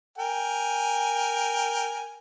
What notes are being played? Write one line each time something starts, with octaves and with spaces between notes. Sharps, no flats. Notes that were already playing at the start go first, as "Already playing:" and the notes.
A#4 G5 G#5